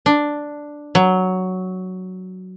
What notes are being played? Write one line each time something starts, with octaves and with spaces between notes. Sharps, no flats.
D4
F#3